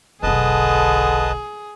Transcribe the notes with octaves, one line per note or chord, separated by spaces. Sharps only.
F1 B1 D3 G#4 B4 D#5 A5